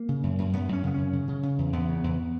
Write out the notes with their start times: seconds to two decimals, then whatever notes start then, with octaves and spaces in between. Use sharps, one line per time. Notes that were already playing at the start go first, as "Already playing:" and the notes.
Already playing: A#3
0.09 C#3
0.23 F#2
0.38 F#2
0.53 F#2 B3
0.69 F#2 C#4
0.83 C#3 B3
0.94 F#2 C#4
1.13 C#3
1.28 C#3
1.43 C#3
1.58 E2
1.73 E2 B3
1.88 C#3
2.04 E2